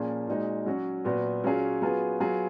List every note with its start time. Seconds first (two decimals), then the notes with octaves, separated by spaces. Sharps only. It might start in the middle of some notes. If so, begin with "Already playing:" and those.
Already playing: A#2 F3 A#3 C#4 G#4
0.28 A#2 G#3 D#4 F#4
0.66 F#3 C#4 F#4
1.05 A#2 F#3 B3 F#4
1.44 F#3 C#4 F4 G#4
1.82 F#3 B3 F4 G#4
2.20 F#3 B3 F4 G#4